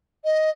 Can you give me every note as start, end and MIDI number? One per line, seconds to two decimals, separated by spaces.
0.24 0.49 75